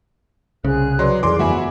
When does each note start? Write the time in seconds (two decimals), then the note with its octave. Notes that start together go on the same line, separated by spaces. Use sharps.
0.64 C2 C#3 G#4 C5 F#6
0.99 F#3 B4 D5 C6
1.23 F2 E3 G#4 A#4 D5 C6 D6
1.39 G1 F#4 E5 G#5 B5